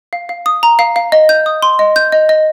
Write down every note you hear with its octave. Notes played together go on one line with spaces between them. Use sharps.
F5
F5
D#6
A#5
F5
F5
D#5
G6
D#6
C6
D#5
G6
D#5
D#5